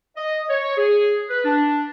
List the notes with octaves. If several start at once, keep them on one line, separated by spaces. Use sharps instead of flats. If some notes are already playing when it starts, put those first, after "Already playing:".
D#5
C#5
G#4
B4
D4